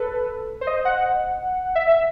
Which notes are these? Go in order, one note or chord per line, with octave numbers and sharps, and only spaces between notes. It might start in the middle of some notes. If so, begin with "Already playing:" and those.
Already playing: A4 B4
C5
D#5
F#5
E5
E5